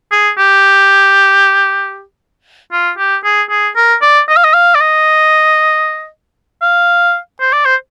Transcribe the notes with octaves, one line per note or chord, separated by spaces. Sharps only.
G#4
G4
F4
G4
G#4
G#4
A#4
D5
D#5
F5
D#5
F5
D5
D#5
F5
C5
D5
C5